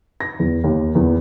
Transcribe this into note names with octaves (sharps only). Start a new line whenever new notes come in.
A#6
E2
D#2
E2